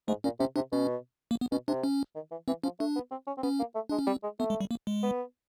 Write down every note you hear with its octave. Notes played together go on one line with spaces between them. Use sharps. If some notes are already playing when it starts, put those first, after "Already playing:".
G#2 A3
A#2 C#4
C3 C#4
C3 D4
B2 C#4
A#3
B3
B2 C#4
C3 D4
C#4
D#3
E3
E3 C4
F3 C#4
A3 D4
B3
C4
C#4
C4
B3 C#4
A#3
A3
G#3 D4
C#4
G3 C4
G#3
A3 B3
G#3
G3
A#3
G#3
B3